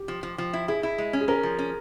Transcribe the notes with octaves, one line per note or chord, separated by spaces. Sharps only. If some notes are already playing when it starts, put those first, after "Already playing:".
Already playing: G4
F3
F3
F3
E4
E4 G#4
E4
G#3
C#4
G#4
C#4 A#4
F3
C#4